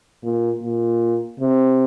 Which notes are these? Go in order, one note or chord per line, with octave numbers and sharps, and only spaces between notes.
A#2
A#2
C3